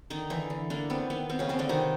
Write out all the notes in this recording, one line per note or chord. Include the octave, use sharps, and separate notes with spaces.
D3 D#3 D#4
D3 E3 E4
D3
D3 A#3 D4
B3 C4
D#3 B3
B3 C4
C#3 C#4
B3 C4
D3 D4
C3 D#3 D#4